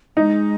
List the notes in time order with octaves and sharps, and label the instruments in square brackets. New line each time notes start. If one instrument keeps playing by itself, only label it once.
[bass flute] G#3 [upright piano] D#4